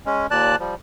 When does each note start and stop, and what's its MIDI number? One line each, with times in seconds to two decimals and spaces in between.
0.06 0.27 56
0.06 0.27 61
0.31 0.56 39
0.31 0.56 46
0.31 0.56 74
0.31 0.56 81
0.31 0.56 90
0.60 0.75 53
0.60 0.75 55